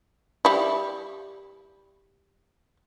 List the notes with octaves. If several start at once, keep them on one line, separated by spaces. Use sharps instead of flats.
G3 E4